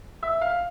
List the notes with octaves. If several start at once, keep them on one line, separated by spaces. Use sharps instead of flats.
E5
F5